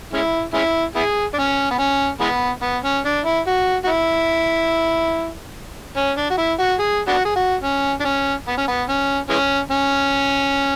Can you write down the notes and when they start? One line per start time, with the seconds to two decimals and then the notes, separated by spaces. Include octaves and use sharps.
0.13 G#3 C#4 E4
0.54 G#3 C#4 E4
0.96 B3 E4 G#4
1.34 D4
1.38 C#4
1.71 B3
1.79 C#4
2.20 E3 G#3 B3
2.62 B3
2.84 C#4
3.05 D4
3.25 E4
3.47 F#4
3.84 F#4
3.88 E4
5.97 C#4
6.17 D4
6.30 F#4
6.38 E4
6.59 F#4
6.79 G#4
7.08 B3 D4 F#4
7.25 G#4
7.36 F#4
7.63 C#4
8.00 D4
8.04 C#4
8.47 B3
8.57 C#4
8.68 B3
8.89 C#4
9.30 E3 G#3 C#4
9.71 C#4